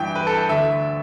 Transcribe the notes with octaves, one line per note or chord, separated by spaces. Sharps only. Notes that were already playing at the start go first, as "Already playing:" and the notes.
Already playing: G2 E3 G5
B4
A4
A4
D2 D3 E5